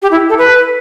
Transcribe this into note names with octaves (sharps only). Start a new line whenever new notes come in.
G4
E4
A4
B4